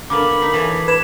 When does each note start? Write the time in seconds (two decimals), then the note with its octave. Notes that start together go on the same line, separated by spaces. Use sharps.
0.10 D3 A#3 B3 B5 D6
0.42 D#4 B6
0.53 E3 A4 C#5
0.88 B4 G#6 E7